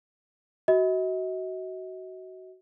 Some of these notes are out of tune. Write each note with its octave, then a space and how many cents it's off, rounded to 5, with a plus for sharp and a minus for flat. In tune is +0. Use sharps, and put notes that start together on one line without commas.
F#4 +15 D#5 +40